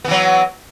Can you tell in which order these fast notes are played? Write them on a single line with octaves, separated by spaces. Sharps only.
B3 E3 F#3